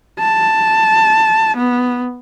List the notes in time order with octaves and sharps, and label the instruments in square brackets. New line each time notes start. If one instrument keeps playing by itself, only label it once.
[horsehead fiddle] A5
B3